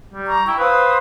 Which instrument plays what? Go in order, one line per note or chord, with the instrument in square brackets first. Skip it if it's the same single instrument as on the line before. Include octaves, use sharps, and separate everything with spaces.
[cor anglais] G3
[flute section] A#5 C#6
[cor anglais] E4 [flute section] G5 C#6
[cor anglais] B4 [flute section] C5 F5 D#6